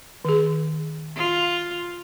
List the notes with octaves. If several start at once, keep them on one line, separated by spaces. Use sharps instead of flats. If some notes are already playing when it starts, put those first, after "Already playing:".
D#3 G#4
F4